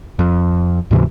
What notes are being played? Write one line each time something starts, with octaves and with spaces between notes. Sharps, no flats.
F2
D2 G#2 C3 E3